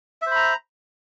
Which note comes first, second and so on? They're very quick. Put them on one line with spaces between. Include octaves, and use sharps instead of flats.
E5 C5 B5 A#5